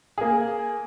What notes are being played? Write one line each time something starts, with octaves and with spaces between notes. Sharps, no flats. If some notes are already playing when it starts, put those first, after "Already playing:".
A#3 G#4